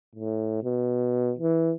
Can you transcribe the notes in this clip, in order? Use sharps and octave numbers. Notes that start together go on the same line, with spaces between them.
A2
B2
E3